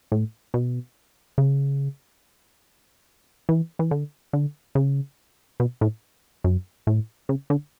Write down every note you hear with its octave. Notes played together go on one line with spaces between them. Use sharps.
A2
B2
C#3
E3
E3
D3
D3
C#3
B2
A2
F#2
A2
C#3
D3